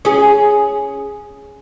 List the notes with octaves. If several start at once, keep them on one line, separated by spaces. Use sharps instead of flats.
C#4 G#4